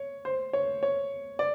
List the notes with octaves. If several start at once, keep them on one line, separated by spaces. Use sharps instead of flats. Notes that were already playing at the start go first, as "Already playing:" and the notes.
Already playing: C#5
C5
C#5
C#5
D5